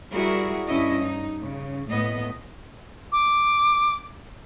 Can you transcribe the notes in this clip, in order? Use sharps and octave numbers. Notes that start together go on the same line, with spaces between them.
G3 E4 F#4 G#4 A#4
G2 C#4 E4 D#5
D#4
C#3
A2 B3 D#5
D6